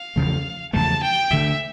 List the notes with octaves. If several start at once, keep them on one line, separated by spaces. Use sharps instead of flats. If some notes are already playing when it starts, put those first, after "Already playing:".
Already playing: F5
E2 C#3 F3 A3
E2 C#3 F3 A3 A5
G5
D2 D3 A3 E5